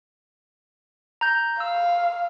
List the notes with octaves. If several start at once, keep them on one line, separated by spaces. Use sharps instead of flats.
A#5 G6
F5 E6